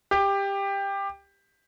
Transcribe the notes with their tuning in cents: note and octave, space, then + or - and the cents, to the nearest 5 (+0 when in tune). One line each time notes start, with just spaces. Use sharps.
G4 +15